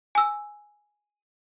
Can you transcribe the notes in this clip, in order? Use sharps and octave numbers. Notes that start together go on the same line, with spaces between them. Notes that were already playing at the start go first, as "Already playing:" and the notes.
G#5 E6